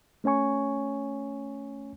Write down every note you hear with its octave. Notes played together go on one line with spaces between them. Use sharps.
A3 C#4 C#5 G#5 C#6